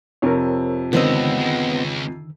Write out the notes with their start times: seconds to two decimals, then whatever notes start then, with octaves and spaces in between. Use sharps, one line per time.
0.22 F2 C3 A#4 C#5
0.93 C#2 D3 D#3 B3 C4 D#5 E6
1.40 C#2 G#3